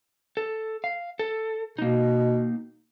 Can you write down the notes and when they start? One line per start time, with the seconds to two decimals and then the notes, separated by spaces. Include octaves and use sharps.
0.37 A4
0.84 F5
1.19 A4
1.78 B2 A#3 D#4